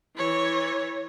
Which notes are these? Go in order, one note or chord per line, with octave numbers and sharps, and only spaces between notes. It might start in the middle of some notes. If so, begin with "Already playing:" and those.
E3 C#5